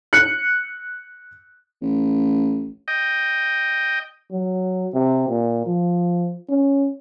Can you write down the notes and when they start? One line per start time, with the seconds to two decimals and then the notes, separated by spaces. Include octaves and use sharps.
0.13 F#6 C#7
1.82 A1
2.88 D#5 G5
4.31 F#3
4.93 C3
5.28 A#2
5.66 F3
6.48 C#4